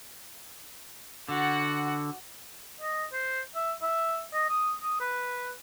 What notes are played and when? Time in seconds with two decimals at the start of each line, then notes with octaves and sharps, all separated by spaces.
1.28 D3 F#4 F#5
2.81 D#5
3.13 C5
3.56 E5
3.82 E5
4.33 D#5
4.50 D#6
4.82 D#6
5.01 B4